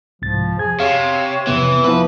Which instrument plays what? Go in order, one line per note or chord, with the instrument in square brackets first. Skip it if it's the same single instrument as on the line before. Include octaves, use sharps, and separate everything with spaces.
[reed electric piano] C2 G#2 A6 [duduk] F3
[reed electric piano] F2 G#6 [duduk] G#4
[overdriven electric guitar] C3 [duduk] C#5 [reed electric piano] F5
[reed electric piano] F2 C3 B3 [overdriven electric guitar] E3
[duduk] F3 [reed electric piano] B3 E4 [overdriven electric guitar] B4